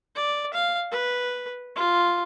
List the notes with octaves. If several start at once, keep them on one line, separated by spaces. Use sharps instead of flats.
D5
F5
B4
F4